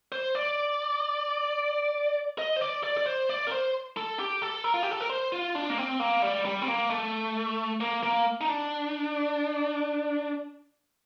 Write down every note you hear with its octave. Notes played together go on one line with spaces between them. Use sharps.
C5
D5
D#5
C5
D5
D5
D5
C5
D5
A#4
C5
A4
G4
A4
A#4
F4
G4
A4
A#4
C5
F4
D4
A#3
C4
A#3
G3
G3
C4
A#3
A3
A#3
A#3
D#4
D4